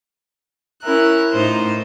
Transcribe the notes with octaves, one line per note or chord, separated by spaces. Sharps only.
C#4 E4 A#4 F#6
A2 D#4 F4 C5